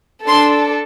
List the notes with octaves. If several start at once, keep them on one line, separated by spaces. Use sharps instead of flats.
D4 A4 C6